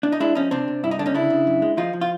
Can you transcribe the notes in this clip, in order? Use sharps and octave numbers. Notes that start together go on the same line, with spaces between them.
D4
D#4
G#3 D4 E4
F3 C#4 D#4
C3 C4 D4
C3
G2 E4
D#4
D3 D4
C#4 D#4
C#3 D4 E4
C#3
F#2
G#3
F3 D#4 F4
F3
F4